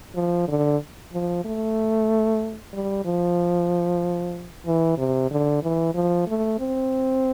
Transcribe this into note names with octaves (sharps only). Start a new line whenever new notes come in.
F3
D3
F3
A3
G3
F3
E3
C3
D3
E3
F3
A3
C4